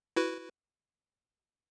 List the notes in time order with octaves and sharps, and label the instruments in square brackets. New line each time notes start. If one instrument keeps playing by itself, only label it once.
[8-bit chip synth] E4 F#4 B4